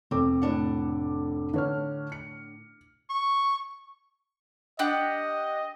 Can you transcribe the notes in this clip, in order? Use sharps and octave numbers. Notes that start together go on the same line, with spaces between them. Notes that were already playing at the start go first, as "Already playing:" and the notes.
F1 C4 A4 D6
A2 D4 F#5
D3 C#5 F6
C#7
C#6
D4 G4 D#5 F#5